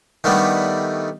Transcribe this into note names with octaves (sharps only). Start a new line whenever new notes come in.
D#3 G3 A3 B3 D4